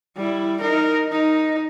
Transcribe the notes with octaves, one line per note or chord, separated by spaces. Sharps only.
G3 E4
D#4 A#4
D#4